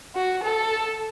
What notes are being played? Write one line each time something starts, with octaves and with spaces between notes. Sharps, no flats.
F#4
A4